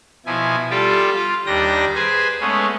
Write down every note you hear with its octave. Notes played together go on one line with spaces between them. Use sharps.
B2 F3 E4 G#5
G3 F4 G4 A4 G5
F4 F5
D#2 G3 D4 G5 A#6
G#4 B4 C5 G#5
G#3 A3 B3 C#4